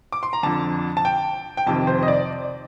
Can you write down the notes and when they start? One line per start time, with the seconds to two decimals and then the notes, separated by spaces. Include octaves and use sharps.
0.12 D6
0.23 C6
0.33 A#5
0.43 F2 D3 A5
0.97 A5
1.05 G5
1.57 G5
1.67 F2 C3 D#3 A5
1.87 C5
2.03 D#5
2.08 D5